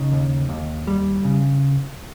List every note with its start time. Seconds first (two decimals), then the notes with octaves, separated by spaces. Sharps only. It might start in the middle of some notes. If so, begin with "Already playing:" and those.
Already playing: C#3 D#4
0.12 D#2
0.49 D#2
0.87 G3
1.25 C#3